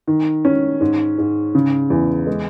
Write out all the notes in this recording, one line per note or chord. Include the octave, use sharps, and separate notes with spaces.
D#3
C#4
G#2
G#2
C#3
E2
G#3